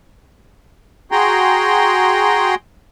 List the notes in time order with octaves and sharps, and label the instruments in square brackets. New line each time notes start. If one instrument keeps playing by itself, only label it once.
[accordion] F#4 G#4 G5 A#5 C6